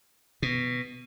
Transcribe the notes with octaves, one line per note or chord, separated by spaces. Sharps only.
B2